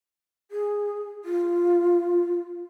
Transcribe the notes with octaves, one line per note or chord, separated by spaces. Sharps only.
G#4
F4